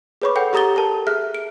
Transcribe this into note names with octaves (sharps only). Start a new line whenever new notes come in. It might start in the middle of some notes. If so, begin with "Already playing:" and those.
G#4 B4 C#5 B5 C#6 D6
A4 F#5 G5 G6
G4 A4 A#5 D#6 A6 G7
A4 A#4 A5
G#4 E5 F6 F#6
D7